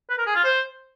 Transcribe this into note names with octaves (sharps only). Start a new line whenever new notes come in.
B4
A#4
G#4
F4
C5